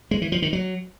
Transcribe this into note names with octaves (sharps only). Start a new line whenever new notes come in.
G#3
E3
F3
D#3
F#3